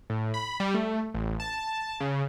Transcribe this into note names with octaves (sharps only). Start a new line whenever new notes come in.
A2
B5
G3
A3
A1
A5
C#3